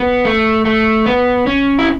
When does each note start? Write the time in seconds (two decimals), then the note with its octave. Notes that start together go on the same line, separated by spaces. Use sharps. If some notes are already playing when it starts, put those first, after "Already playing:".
Already playing: B3
0.25 A3
0.65 A3
1.06 B3
1.47 C#4
1.79 E4